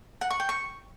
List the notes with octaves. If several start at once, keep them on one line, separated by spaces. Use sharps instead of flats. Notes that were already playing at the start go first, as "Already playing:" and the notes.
F#5
C#6
G5
C#6